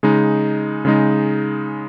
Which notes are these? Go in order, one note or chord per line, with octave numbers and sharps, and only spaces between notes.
C#3 G#3 D#4
C#3 G#3 D#4